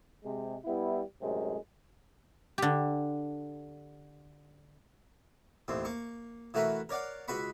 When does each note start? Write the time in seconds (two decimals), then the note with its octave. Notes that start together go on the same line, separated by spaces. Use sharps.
0.23 C3 G#3
0.65 G3 B3 E4
1.21 F#2 A2 C3 G#3
2.58 D3 G4
5.68 A1 D#2 C4
5.85 A#3 C#6
6.54 E3 A3 F#4 A#4 B4 F#5
6.89 A#4 C#5 D5 F5 F#5
7.28 C#2 F#4 B4 B5 C#6